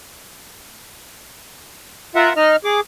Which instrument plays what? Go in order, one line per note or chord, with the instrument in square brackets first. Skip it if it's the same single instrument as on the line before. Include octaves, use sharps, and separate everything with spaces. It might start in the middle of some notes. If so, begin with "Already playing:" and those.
[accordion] F4 A#4 E5 F#5
D#4 D#5 F6
G#4 D6